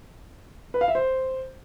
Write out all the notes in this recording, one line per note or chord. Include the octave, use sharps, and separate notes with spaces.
B4
F5
E5
C5